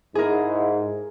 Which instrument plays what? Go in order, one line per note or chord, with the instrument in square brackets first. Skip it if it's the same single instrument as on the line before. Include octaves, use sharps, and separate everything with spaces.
[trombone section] G#2 [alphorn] E4 [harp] G#4 A#4